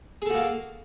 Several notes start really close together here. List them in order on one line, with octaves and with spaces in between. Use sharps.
G#4 A4 F#4 A#3